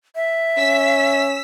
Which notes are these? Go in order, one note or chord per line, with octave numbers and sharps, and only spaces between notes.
E5
C#4 E6 B6